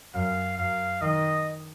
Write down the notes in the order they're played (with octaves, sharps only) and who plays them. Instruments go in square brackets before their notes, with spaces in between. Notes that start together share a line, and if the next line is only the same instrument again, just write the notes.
[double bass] F#2 [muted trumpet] F5
[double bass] F#2 [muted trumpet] F5
[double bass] D#3 [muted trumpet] D#5